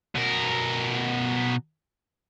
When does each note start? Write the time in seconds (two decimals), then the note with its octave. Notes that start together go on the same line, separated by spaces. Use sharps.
0.15 B2 A#4